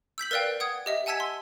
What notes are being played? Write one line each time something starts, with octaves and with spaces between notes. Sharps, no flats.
E6 G6 B6 F#7
A#4 B4 D5 F5 G5
F#5 D#6 G#6
G4 D#5 E5
F#5 G#5 A5 E6 G#6 B6
C6